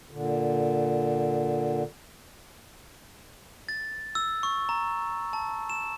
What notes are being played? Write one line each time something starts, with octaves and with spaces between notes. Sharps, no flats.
A#2 D3
A6
E6
C#6
A#5
A5
E7